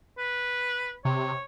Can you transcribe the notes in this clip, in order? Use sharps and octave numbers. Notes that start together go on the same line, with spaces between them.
B4
C3 C#5